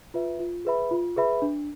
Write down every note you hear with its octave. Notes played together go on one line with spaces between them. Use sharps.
F4 B4 E5
F4
G#4 B4 E5 B5
F4
G#4 B4 E5 B5
D4